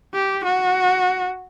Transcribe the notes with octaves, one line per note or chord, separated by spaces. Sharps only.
G4
F#4